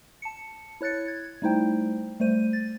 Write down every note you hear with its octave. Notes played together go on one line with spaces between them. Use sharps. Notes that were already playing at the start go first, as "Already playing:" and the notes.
A5 C#7
E4 C#5 F#6 A6 C#7
G#6
G3 A3 D#4 E4 C5 G5
G3 A3 C5 D#7
A6